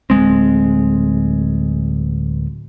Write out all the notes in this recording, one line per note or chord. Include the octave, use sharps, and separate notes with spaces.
D1 D2 G#3 C4